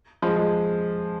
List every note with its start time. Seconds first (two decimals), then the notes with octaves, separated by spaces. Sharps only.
0.22 F3 G#3
0.36 F3 G#3